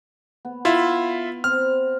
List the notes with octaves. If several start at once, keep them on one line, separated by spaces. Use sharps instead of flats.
B3
E4 F4 E5
C4 F6